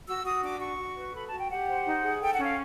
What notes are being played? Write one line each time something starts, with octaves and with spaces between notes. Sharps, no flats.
F#4 E6
F#4 D#6
D4 D6
F#4 C#6
F#4
B4
A4 B5
A5
F#4
G5
G4 F#5
C5
D#4
G#4
A4 G5
F#5
C#4
F5